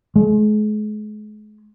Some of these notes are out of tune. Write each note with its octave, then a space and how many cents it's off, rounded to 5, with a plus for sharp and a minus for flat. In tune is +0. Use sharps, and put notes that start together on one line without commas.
G#3 +40